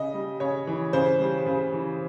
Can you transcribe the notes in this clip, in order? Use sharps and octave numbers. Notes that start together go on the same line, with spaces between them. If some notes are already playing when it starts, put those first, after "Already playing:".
Already playing: C#3 D#5
G3
C#3 C#5
E3
C#3 C5
G3
C#3
E3